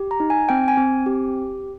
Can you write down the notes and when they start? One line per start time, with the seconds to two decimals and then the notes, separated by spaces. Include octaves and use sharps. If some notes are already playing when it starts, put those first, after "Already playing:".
Already playing: G4
0.11 A#5
0.20 D#4
0.30 G#5
0.49 C4 G5
0.68 G#5
0.77 C4
1.06 G4